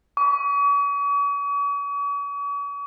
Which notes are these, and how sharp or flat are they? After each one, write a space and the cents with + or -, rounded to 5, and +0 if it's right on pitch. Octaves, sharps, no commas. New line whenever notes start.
C#6 +45